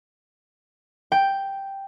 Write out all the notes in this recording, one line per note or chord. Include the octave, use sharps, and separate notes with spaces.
G5